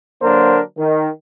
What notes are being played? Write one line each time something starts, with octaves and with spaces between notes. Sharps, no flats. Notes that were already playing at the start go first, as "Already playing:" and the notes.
D3 F#3 A#3 D4 A#4 C5
D#3